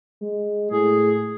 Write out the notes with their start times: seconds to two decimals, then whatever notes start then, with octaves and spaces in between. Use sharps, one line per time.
0.22 G#3
0.71 A2 G#4